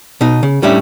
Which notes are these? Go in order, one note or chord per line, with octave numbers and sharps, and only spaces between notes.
B2 D#4
C#3
A2 G3 C#4 D4 E5